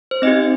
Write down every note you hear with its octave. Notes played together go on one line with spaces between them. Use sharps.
C5
C4 D#4 G4 D#5